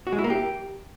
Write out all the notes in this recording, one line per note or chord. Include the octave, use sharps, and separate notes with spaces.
F#4
G#3
E4
A#3
G4